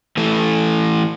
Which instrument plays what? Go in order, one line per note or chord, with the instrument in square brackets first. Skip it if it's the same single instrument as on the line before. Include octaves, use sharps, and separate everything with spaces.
[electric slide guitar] E3 A3